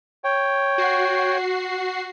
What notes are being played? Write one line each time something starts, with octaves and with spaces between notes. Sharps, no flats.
C#5 G5
F#4 C7